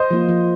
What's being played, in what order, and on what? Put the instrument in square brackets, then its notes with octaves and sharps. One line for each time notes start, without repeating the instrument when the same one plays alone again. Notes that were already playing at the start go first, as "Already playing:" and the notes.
Already playing: [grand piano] C5 D#5
[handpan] F3 A#3 F4
F3